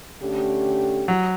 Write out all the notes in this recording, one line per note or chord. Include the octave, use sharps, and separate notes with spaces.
D3 A3 C#4 G4
F#3